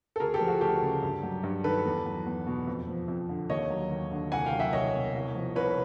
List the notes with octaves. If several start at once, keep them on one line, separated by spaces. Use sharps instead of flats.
A4
D2 G#4 A#4
G4 A4
F3
F#4 G#4
D2 G4 A4
C#3
G2
F#3
G2
D#3 A4 B4
E2
F#3
E2
B2
F2
F3
F2
D3
D#2 C#5 D#5
F#3
D#2
D3
C2 F#5 G#5
F5 G5
F#3
E5 F#5
C2 C#5 D#5
B2
C2
F3
C2 B4 C#5